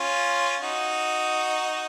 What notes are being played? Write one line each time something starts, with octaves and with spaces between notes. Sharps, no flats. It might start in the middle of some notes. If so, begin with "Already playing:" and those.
Already playing: C#4 F4
D#4 F#4